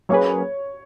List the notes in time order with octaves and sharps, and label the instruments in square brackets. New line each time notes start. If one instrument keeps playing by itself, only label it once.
[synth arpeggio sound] F#3 A#3 C#4 G#4 B4 [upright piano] C#5